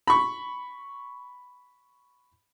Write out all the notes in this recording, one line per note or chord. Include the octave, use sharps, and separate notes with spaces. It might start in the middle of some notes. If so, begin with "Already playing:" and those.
B5 C#6